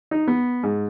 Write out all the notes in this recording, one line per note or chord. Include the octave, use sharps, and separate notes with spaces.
D#4
B3
G#2